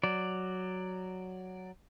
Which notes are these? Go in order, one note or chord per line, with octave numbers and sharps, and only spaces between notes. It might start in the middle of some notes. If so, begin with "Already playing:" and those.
F#3 D5